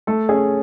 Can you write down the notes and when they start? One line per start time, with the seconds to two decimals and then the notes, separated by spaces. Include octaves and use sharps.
0.07 A3 A4
0.29 C#4 G#4